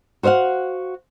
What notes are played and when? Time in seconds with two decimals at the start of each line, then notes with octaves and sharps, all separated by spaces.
0.23 F#4 C5 D#5 F5 F#5